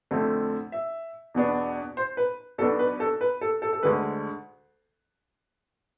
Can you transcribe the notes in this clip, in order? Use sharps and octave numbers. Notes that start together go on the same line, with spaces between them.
F2 D3 A3 C4
E5
E2 B2 B3 D4
C5
B4
B1 B2 B3 D4 A4
B4
A4
B4
A4
A4
A4
D2 D3 G#3 B4